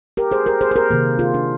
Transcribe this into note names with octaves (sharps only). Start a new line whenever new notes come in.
G4 A#4
G#4 C5
G4 A#4
G#4 C5
C5
G4 A#4
C3 D#3 A#3
F4 G#4
D4